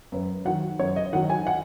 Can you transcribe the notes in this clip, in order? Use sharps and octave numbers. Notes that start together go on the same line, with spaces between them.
F#2 B4
D#3 F#3 F#5
F#2 C#5
D#5
D#3 F#3 F#5
G#5
F#5